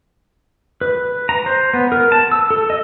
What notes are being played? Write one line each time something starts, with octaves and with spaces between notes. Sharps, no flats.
B4
A#5
C5
B3
A#4
A5
E6
A4
D#5